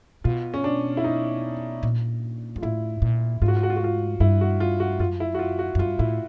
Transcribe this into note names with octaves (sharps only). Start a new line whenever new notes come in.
B2 F4
C#4
D4
E4
D#4
A#2
G#2 F4
A2 E4
A#2
G#2 F4
F#4
F4
F#4
F4
F#4
F4
G2 E4
F#4
F4
F#4
F#2 F4
E4
F#4
F4
F#4
F#2
G2 F4
A2 E4